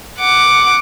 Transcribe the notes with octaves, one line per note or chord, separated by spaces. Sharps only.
F#5 D6